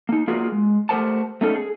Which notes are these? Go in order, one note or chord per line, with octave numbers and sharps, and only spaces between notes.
A#3 D#4
A#3 F4 F#4 G#4 A#4
G#3
A3 G4 A#4 C5 F#5 A5
A3 B3 C#4 D#4 A4 A#4
G#4